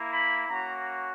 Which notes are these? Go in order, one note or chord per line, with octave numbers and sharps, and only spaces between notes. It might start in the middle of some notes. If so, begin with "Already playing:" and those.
Already playing: A#3 E4
B5
A#3 C#4 F#4 A#5